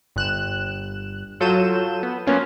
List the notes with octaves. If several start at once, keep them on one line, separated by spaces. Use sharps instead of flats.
G1 F#6 E7
F#3 F4 A4 G6 D#7 E7
B3
F#3 A#3 B3 C#4 F4